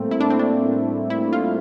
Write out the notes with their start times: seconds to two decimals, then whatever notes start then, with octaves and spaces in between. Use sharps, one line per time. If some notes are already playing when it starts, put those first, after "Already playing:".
Already playing: A2 G3 A3 A#3 C4
0.11 E4
0.20 D4
0.30 C4
0.39 D4
1.10 E4
1.33 F4